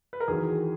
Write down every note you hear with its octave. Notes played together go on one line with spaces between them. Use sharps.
B4
A#4
E2 D#3 F#3 G#4